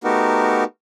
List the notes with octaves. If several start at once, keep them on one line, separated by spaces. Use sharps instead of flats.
A3 B3 D#4 F#4 G4 A#4